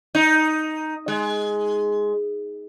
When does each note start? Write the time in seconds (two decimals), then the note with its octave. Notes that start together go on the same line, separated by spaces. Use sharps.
0.15 D#4
1.08 G#3